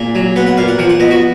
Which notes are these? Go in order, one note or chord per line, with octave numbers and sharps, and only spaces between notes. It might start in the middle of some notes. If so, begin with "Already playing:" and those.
Already playing: A#2 G#4
F#3
B3 F#5
F#5
A#2 F5
F#5
F3 F#5
F#5
B3 D#5
F#4